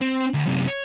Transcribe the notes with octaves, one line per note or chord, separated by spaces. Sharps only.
C4
D2
F#2 C3
C#5